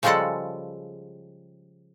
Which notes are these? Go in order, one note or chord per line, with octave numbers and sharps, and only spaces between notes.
C#3 F3 G3 G#3 A4 F#5